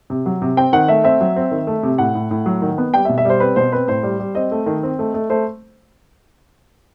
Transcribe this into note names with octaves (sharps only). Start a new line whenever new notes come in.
C3
F#3
C3
C4 G5
D#3 F#5
A3 E5
C4 E5
F#3
C4
D#3
A3
C3
A2 F#5
A2
A2
F#3
D#3
B3
G3 G5
E5
B2
E5
G3 C5
C4 B4
B2 C5
C4 B4
A2 C5
G3
G3
C4 D#5
A3
D#3
C4
A3
A3
A3 C5